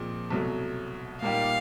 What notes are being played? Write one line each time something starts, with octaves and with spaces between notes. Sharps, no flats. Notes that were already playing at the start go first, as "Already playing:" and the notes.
Already playing: A#2 F3 G#3 C4
C2 B2 F#3 A3
A#2 G3 A#3 D#4 G4 F5